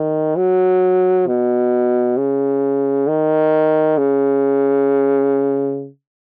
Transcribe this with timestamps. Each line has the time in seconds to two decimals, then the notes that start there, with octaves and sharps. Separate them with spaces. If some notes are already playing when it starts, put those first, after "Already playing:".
Already playing: D#3
0.37 F#3
1.27 B2
2.17 C#3
3.07 D#3
3.98 C#3